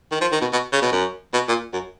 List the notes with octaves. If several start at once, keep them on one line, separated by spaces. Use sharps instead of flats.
D#3
F3
D#3
B2
B2
C#3
B2
F#2
B2
A#2
F#2